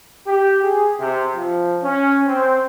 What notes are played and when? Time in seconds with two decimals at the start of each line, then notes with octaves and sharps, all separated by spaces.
0.27 G4
0.63 G#4
1.00 C3
1.35 F3
1.83 C#4
2.28 C4